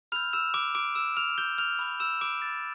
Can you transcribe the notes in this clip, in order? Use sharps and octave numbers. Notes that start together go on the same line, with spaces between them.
B5 E6 F6 G6 F7
E6 E7
D6 D7
D6 D7
E6 E7
F6 F7
G6 G7
F6 F7
B5 D6 F6
E6 E7
D6 D7
A6